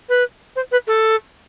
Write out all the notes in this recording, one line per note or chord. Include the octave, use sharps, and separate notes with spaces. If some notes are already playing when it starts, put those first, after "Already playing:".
B4
C5
B4
A4